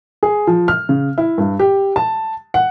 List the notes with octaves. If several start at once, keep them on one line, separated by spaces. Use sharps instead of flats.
G#4
F3
F6
C#3
E4
G2
G4
A5
F#5